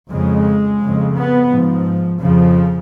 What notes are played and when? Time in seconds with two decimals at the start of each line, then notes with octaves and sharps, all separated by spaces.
0.10 F2 C#3 G#3
0.81 F2 C#3
1.16 B3
1.51 G#2 F3
2.21 F2 C#3 F3